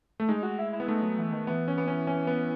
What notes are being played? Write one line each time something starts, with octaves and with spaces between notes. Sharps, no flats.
A3
G#3 D#4
F#4
E4
E4
B3
A3 D#4
F#3
E3
D#3
E3 B3
C#4
B3
C#4
C#4
B3